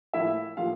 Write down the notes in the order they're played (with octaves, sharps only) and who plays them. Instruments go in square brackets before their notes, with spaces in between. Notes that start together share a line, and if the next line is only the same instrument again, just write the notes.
[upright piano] A2 F3 A#3 E4 E5
A2 F3 A#3 F4 F5